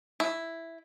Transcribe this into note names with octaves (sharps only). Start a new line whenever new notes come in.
E4